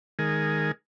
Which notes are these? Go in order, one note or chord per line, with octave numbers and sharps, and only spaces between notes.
D#3 G#3 G#4 A#4